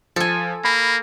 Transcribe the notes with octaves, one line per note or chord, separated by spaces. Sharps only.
F3 A4 G#5
A#3 B5